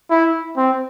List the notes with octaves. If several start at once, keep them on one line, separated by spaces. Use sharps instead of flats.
E4
C4